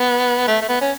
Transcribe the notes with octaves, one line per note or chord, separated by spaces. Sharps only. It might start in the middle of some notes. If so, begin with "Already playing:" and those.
Already playing: B3
A3
A3
B3
C#4